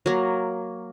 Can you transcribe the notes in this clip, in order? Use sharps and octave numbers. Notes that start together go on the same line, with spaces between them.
F#3 A#3